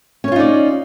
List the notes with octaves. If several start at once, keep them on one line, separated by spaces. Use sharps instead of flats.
C#4 D#4 F4 C#5 D5